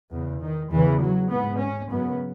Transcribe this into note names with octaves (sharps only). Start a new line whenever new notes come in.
E2 C#3
D#3
E2 C#3 E3
F#3
G#2 B3
C#4
F#2 C#3 B3